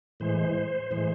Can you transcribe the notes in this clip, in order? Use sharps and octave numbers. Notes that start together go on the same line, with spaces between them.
A2 E3 G#3 C5
A2 E3 G#3 C5